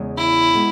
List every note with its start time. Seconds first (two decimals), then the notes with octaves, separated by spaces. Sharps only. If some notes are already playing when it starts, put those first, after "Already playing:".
Already playing: E2 C#3 G#3
0.17 E4
0.55 B2 G#3 B3